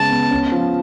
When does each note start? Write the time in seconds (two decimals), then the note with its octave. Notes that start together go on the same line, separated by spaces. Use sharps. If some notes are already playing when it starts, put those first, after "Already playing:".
Already playing: C#3 G#3 B3 A5
0.10 B3
0.31 C#4
0.52 F3